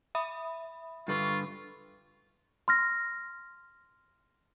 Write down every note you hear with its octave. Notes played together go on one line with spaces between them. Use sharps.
E5 B5 D#6
G2 D3 F4 B4 C#6
C6 F6 A#6